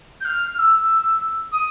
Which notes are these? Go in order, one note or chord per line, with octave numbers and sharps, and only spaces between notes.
G6
F6
F6
E6
D#6